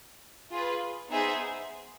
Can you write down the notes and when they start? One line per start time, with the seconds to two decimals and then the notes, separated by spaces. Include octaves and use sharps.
0.50 F4 G#4 B4
1.09 B3 D#4 G#4 C5 E5